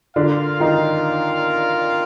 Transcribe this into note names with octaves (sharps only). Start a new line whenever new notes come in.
D3 D4 F4 A#4 D5 F5
D#3 D#4